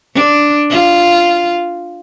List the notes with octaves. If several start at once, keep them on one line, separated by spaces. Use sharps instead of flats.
D4
F4